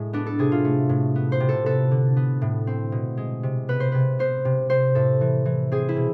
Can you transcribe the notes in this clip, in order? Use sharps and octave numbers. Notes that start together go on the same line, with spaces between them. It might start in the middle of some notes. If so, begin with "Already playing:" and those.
Already playing: A2 G#3
B3 D4
A4
C3 G#4
F4
A3
A2
B3
C5
C3
A4
B3 A4
D3
B3
A2
C4
B2
G#3
C3
B3 B4
C5
C3 B4
B3 C5
C3
C4 C5
A2 A4
E3
E3
C4 G#4
E4
B2